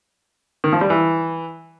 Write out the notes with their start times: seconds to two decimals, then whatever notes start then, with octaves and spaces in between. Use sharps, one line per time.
0.64 D#3
0.73 F3
0.81 G3
0.90 E3